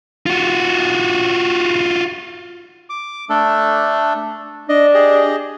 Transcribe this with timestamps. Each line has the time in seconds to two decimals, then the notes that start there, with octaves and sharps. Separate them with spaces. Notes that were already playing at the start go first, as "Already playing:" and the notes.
0.26 F4 F#4
2.90 D6
3.29 A3 D4 A4
4.69 D4 D#5
4.94 G4 G#4 D#5